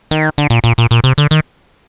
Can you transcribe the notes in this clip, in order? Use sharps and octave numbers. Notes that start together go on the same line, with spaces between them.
D#3
D3
A#2
A#2
A#2
A#2
C3
D3
D#3